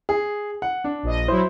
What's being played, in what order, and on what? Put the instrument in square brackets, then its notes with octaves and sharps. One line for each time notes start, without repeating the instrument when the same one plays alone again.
[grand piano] G#4
F#5
D4
[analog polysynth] A#1 D#5
[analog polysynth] F#3 E4 [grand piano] C5